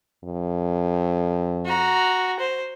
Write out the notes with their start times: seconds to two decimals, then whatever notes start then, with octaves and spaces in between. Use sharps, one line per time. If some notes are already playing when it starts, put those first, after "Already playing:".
0.24 F2
1.65 F#4 A#5
2.39 C5